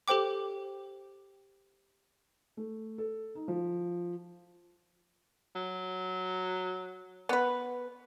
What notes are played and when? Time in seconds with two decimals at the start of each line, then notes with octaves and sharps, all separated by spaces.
0.08 G4 A4 C5 G5 D6
2.57 A3
2.98 A4
3.35 D#4
3.48 F3
5.56 F#3
7.29 B3 B4